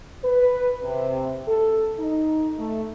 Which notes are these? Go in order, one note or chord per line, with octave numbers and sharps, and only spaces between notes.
B4
C3
A4
D#4
A3